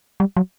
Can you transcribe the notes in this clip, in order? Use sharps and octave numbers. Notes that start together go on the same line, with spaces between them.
G3
F#3